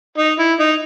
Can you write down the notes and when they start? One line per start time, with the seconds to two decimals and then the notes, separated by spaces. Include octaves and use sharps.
0.18 D#4
0.39 E4
0.59 D#4